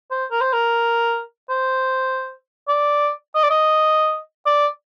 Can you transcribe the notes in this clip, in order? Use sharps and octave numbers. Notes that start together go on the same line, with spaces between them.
C5
A#4
C5
A#4
C5
D5
D#5
D5
D#5
D5